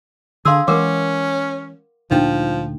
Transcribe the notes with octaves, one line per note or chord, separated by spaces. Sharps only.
D3 G#4 F5 C6 E6
E3 G#3 C#4 A#4 F#5 D6
D2 A#2 F3 D4 D#4 G5